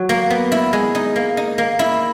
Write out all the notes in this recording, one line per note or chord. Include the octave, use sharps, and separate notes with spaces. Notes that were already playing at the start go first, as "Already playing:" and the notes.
Already playing: F#3
A#3
B3
E4
G#3
D#4
A#3
D#4
A#3
E4